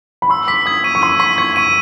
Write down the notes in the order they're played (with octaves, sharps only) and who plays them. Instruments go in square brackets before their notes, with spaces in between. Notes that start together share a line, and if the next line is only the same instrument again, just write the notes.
[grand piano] B5
[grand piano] C6 [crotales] E6
[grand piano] D6 [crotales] B6
[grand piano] D#6 [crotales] G#6
[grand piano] C#6 [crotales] D#7
[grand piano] C#6
[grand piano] C6 [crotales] E6
[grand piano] C6 [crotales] B6
[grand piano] C#6 [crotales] G#6
[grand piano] C#6 [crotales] D#7